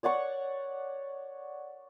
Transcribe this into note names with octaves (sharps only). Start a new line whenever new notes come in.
C#5 D5 F#5 C#6